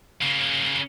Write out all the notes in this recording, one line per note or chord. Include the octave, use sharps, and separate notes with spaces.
C#3 A#3